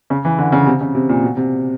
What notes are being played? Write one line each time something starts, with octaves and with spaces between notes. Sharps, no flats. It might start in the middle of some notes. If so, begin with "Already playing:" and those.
C#3
E3
D3
C#3
C3
C#3
C3
A#2
B2
C3